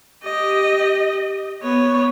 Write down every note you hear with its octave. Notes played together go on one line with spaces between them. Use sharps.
G4 D#5
B3 C#5